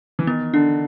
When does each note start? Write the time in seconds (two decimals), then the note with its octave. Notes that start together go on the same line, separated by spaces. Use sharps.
0.19 E3
0.27 D#3 B3
0.54 D3 D4